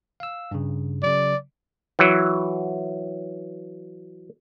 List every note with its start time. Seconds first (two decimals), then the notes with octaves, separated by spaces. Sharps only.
0.20 F5 E6
0.51 G2 C#3
1.03 C#3 F#3 D5
1.99 E3 F#3